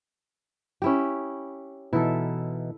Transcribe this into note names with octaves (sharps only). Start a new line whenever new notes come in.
C#4 E4 G4
B2 E3 D#4 E4 A4